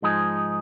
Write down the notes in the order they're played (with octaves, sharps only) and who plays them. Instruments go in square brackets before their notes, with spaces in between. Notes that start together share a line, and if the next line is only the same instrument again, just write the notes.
[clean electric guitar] G#2 F3 G#3 D#4 G#4